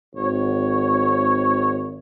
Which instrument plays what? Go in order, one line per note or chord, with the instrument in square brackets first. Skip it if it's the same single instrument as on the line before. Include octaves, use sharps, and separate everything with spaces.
[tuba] G#1 [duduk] C#5